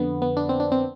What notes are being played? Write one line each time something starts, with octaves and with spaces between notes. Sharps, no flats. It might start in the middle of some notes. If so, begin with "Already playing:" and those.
Already playing: F2 D3 B3
B3
D4
C4
D4
C4